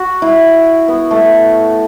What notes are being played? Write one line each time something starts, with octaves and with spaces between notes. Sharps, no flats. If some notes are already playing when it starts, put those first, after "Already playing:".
Already playing: F#4
E4
B3
A3